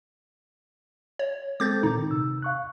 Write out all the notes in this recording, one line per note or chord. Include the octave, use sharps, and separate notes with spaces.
C#5
G#3 C4 A4 D6 G6 A6
A#2 D#3 D#4
C3 E6
F5 C#6 F#6